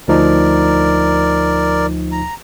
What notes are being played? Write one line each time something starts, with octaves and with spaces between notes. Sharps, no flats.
D2 F3 D#4 A#4 D5
A#5